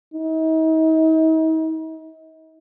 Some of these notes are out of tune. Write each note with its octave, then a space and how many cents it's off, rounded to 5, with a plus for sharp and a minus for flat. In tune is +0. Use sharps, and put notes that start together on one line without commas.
D#4 +45